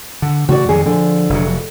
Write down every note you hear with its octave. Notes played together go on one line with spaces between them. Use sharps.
D3
C#3 E3 A3 F#4 D5
F2 D#3 F#3 G#4
D3 F3
F1 F#3